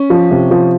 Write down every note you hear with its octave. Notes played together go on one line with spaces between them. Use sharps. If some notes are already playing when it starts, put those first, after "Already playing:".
Already playing: C#4
F3
C3
F3